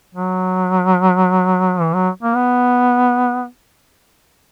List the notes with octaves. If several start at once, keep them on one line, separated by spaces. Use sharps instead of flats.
F#3
E3
F#3
A#3
B3